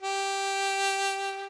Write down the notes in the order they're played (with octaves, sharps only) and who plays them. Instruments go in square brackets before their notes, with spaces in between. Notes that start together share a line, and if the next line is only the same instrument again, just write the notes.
[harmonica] G4